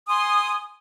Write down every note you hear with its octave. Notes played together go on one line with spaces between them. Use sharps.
G#5 C6 D#6